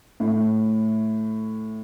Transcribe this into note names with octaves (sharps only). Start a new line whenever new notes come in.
A2